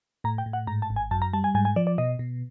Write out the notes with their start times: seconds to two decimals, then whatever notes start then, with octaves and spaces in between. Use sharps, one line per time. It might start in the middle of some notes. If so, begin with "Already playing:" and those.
0.24 A2 A#5
0.38 G5
0.46 A2
0.53 F#5
0.67 G#2 A#5
0.82 A5
0.90 G#1
0.96 G#5
1.11 F#2 A5
1.22 A#5
1.33 G3 A5
1.44 G#5
1.55 G#2 G#5
1.65 G#5
1.76 F3 D5
1.87 D5
1.98 B2 D#5
2.19 B2